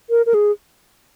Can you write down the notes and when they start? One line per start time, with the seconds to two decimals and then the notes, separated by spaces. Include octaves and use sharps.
0.10 A#4
0.26 A#4
0.34 G#4